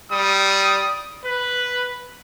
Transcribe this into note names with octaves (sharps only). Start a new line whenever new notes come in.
G3 D#6
B4